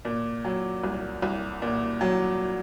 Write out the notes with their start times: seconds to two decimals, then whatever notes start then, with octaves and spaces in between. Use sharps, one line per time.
0.05 A#2
0.45 F#3
0.83 C2
1.22 C2
1.62 A#2
2.01 F#3